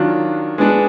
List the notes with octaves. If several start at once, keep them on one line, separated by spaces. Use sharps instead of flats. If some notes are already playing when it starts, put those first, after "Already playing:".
Already playing: D#3 F#3 D4 F4
G#3 B3 D4